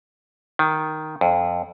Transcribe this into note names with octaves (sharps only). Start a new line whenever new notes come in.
D#3
F2